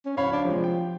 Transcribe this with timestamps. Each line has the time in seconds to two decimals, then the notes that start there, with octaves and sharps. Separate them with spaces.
0.05 C#4
0.17 D1 C#5 F5 B5
0.32 D4
0.45 C3 F3 G#3
0.64 G5